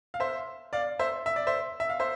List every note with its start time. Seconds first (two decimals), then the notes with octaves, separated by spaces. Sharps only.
0.14 F5
0.20 C5 E5
0.73 D5 F5
0.99 C5 E5
1.26 E5
1.36 D5
1.47 C5 E5
1.80 E5
1.89 F5
2.00 C5 E5